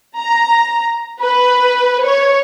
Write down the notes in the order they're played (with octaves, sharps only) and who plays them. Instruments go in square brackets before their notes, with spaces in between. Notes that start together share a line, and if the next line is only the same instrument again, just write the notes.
[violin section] A#5
B4
C#5